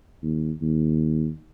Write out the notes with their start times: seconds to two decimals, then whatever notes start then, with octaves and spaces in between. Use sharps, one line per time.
0.23 D#2
0.62 D#2